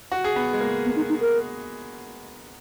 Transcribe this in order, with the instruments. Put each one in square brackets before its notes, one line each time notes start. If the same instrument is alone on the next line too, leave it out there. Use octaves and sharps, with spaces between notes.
[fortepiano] F#4
G#4
B3
G#3
A#3
[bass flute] B3
D#4
D#4
A#4